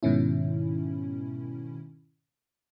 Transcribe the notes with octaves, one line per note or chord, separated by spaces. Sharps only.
G#2 B2 D#3 C#4 E4